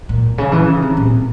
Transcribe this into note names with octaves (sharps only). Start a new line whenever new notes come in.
A#2
C#3
E3
C#3
C3
A#2